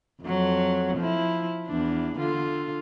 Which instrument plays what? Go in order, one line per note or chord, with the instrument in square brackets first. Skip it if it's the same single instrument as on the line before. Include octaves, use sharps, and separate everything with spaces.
[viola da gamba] F2 F#3
F3 E4
E2 D4
D3 F4